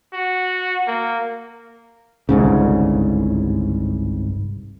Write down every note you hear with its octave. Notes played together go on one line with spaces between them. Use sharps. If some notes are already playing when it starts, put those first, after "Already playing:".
F#4
A#3
G1 C2 G#2 C#3